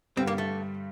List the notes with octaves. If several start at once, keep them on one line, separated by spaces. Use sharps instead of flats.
G2 D3 G3 C4
A#3
A3